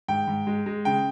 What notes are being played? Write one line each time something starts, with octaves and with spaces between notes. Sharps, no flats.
G#2 G5
G#2
G#3
G#3
C#3 G5